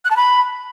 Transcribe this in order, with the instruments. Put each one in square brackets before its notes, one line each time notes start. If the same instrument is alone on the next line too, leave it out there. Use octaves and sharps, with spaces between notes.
[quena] F#6
A5
B5